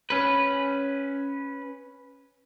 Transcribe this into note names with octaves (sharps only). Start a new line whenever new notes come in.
C#4 B4